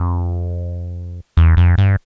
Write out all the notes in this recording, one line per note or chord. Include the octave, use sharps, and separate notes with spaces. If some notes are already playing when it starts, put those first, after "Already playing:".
Already playing: F2
E2
F2
G2